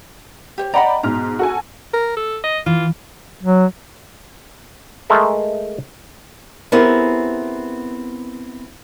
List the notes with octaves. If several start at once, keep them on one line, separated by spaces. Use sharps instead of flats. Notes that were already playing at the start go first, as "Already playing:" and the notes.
G4 C5 C#5
D5 D#5 F#5 G5 A#5 B5
G#2 B2 A#5 F6
F#4 A4 G#5
A#4
A4
D#5
E3 F4
F#3
G#3 A3 A4 A#4 E5
B3 C4 E4 G4 G#4 A#4